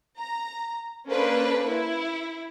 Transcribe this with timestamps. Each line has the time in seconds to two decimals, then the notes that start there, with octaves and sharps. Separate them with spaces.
0.18 A#5
1.08 A#3 C#4 D4 A4 B4 C5
1.69 E4